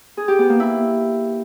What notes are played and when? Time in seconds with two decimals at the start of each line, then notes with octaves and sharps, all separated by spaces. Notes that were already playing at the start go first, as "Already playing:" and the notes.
0.17 G#4
0.28 G4
0.39 B3
0.49 A#3
0.60 E4